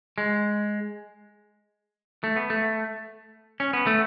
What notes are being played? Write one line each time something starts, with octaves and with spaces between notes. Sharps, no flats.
G#3
A3
B3
A3
C#4
B3
A3